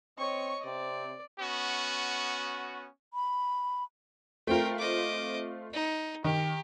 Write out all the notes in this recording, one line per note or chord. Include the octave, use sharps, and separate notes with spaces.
C4 C#5 D#5 C#6
C3 C4 D5
B3 C#4 F#4
B5
A3 C4 F4 A#4 G5
D#5 D6
D#4
D#3 G4